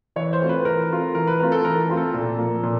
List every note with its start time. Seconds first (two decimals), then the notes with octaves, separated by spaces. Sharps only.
0.16 E3 C#5
0.33 C5
0.41 A3 C4 F4
0.49 B4
0.65 E3 A#4
0.90 A3 C4 F4
1.15 E3 A#4
1.27 B4
1.39 A3 C4 F4 A#4
1.52 A4
1.64 E3 A#4
1.89 A3 C4 F4
1.97 A4
2.14 A#2
2.38 F3 A#3
2.63 A#2